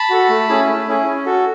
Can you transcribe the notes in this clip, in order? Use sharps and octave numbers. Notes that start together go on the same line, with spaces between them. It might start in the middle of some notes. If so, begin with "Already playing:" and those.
Already playing: A5 B5
F#4 A4
A3
C#4 E4 G#4
A3
C#4 E4 G#4
C#4
F#4 A4